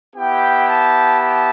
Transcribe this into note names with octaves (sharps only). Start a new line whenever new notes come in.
B3 E4 G4 G5
A5
A5